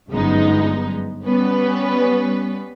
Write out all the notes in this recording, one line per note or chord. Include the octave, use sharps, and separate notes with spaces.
G1 F#2 G#3 B3 D#4
G3 B3 C#4 B4